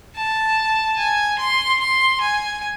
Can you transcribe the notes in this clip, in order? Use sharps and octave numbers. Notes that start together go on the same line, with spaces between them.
A5
G#5
C6
C6
G#5